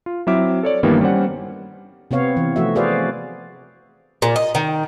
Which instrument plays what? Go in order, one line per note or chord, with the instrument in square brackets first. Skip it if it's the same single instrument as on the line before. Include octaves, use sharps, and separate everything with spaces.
[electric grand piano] F4
F#3 C4 E4 E5 D6 F6
A4 C#5 D5
G2 D#3 E3 G3 A#3 B3
G3 C#4 C5 F#5
[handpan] C3 B3 C4 C#5 F5
E3
F3 A3 F#4 E5
F#4 G#4 B4 C5 D5 F5
[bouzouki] A#2
D#5
D#3